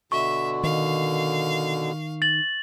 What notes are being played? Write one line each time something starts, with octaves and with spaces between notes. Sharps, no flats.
B2 D3 E5 C#6
D#3 F5
A6 F#7